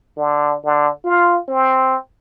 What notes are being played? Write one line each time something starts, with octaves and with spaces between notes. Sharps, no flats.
D3
D3
F4
C4